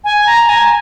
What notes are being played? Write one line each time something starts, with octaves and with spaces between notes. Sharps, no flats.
G#5
A#5
G#5